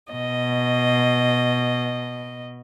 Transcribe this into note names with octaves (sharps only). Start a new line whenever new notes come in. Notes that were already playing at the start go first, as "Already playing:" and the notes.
B2 D#5